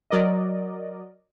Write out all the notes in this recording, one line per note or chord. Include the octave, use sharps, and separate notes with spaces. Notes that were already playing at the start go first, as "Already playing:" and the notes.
F#3 A#4 D5 D#5